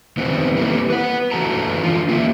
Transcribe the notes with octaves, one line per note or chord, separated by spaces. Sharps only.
D#3 E3 G3 B3 C4
G3 A#3 E4 G4 A4 B4
B4 F#5
D3 E3 F#4 A4 A5 A#5
D3 F4
A#3 F4 G4 E5